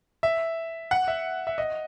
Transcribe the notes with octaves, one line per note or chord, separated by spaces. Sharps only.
E5
F#5
E5
E5
D#5